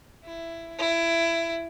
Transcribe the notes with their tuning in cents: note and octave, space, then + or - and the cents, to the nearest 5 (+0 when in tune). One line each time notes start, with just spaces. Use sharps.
E4 +15
E4 +20